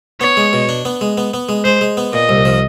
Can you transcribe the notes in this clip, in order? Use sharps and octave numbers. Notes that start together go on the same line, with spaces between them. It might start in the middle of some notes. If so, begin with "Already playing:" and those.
B3 C#5
G#3
B2
D4
B3
G#3
B3
B3
G#3
G#3 C5
G#3
B3
A#2 D#5
C2
F3